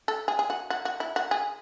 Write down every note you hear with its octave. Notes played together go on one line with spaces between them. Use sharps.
A4
G#4
G#4
F#4
F#4
F#4
E4
F#4
G#4